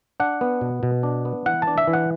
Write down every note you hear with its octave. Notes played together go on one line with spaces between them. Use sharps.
D4 F#5
B3
B2
B2
D4
B3
E3 F#5
A5
D4
E5
E3
F#5